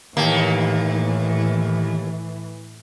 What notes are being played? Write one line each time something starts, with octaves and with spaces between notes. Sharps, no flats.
D#2 A2 E3 A#3